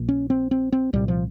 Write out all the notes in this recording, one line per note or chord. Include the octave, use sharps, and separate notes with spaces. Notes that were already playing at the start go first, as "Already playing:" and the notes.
Already playing: A#1 A#2
C#4
C4
C4
C4
C2 A#2 G3
F3